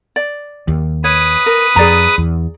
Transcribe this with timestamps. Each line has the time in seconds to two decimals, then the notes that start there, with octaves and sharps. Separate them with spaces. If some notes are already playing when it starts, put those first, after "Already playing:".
0.16 D5
0.68 D#2
1.04 B4 C#5 D#6
1.46 A#4
1.76 F2 G#4 D5 A#5
2.18 E2